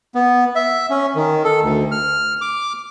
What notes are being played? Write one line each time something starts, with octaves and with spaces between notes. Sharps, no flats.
B3
E5
C#4
D#3
A4
D2
F6
D6